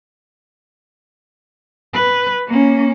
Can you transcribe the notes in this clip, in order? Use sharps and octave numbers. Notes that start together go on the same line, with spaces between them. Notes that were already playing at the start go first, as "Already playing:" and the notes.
B4
A#3 C#4